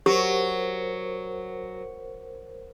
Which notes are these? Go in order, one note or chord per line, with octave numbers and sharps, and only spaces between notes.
F#3 G4 A#4 C5